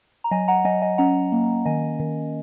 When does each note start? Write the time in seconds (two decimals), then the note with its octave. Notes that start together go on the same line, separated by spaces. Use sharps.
0.24 A#5
0.31 F#3 D#5 G#5
0.48 F#5 A#5
0.65 F#3 D#5 G#5
0.82 D#5 G#5
0.98 C#4 F#5 A#5
1.32 A#3
1.65 D#3 D#5 G#5
2.00 D#3